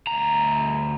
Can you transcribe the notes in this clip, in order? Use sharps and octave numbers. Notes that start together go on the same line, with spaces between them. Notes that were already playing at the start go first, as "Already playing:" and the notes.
D2 A#5